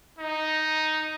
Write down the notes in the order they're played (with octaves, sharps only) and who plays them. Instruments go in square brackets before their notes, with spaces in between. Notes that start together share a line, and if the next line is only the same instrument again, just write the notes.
[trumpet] D#4